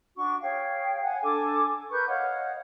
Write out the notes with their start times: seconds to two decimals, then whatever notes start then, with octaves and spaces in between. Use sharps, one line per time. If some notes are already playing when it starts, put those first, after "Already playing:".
0.15 D4 F#4 C#6
0.41 G#4 C#5 F5 G5
1.02 F#5 G#5
1.22 D4 A4 G#5 D6
1.90 A#4 B4 C#6 G6
2.07 C#5 D#5 F5 F#5